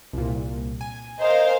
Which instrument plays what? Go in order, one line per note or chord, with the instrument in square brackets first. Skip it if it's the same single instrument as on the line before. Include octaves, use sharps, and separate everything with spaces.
[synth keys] C2 A#2
G#5
[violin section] A#4 C5 F5 [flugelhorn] D#5